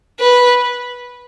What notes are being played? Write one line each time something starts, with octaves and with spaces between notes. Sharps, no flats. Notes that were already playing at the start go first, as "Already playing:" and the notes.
B4